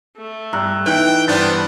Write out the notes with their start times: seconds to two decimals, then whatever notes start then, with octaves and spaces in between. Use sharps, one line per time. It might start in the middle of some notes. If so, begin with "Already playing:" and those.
0.17 A3
0.53 G2 A#5 E6 F#6
0.86 E3 D#4 G5 F#6
1.27 G2 B3 D4 C5 B5 A6